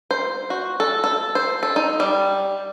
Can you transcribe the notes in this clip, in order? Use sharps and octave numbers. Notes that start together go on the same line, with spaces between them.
C5
F#4
A4
A4
C5
A4
D#4
G3